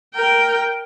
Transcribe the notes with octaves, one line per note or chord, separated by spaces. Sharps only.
A#4 G5